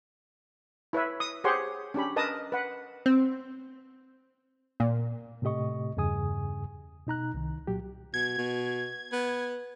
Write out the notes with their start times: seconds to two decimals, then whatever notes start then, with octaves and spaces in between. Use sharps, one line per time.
0.93 E4 B4 C#5 E5
1.20 D#6
1.44 G4 G#4 C5 C#5 F#5 C6
1.94 C#4 D4 G4 B5
2.16 A#4 B4 D#5 A5 D#6
2.52 B4 F#5
3.06 C4
4.80 A#2
5.42 A2 C3 A3 G4 D#5 C#6
5.97 E2 G2 C#3 G#4 G#5 D#6
7.07 B2 D#4 A#5 F#6
7.34 C2 D#3
7.67 A#2 F#3 G4
8.14 B2 G#6
8.38 B2
9.12 B3